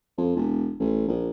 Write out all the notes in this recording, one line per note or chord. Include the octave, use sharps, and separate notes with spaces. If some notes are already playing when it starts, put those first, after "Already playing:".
F2
E1
A1
A#1